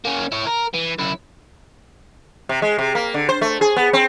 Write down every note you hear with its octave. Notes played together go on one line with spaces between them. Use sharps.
A#3 C#4
E4 C#5
A#4
E3
F#2 E4
C3
G#3
C3
A#3
D3
C5
A3
G#4
B3
C4